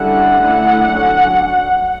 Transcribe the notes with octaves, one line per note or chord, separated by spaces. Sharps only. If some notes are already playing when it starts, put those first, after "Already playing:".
Already playing: D3 G3 C#4 E4 F#5
D3 A3 E4
D3 F#3 C#4